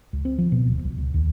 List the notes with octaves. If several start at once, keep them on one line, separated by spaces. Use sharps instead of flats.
C#2
C4
F3
B2
D1
C2
C#2
D#2